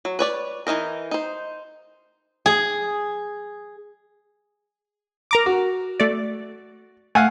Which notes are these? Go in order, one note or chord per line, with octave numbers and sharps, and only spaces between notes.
F#3
B4 C#5 D5
E3 F3 D#4 A#4
D#4 C5
G#4
A#4 A#5 D6
F#4
A3 D5
A3 F5 F#5 G#5